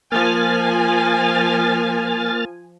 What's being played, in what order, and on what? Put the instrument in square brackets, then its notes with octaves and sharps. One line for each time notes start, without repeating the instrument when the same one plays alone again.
[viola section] F3 G#5 [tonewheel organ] A#3 F6 A6